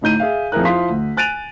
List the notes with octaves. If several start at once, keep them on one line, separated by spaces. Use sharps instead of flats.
D2 A2 D#4 G6 D#7
G#4 E5 F5
F2 C4 E4 G#4 A#4 F#6
F3 E4 F5 C6 D#6 B6
D2
G#5 F#6 A6 D7 D#7 F7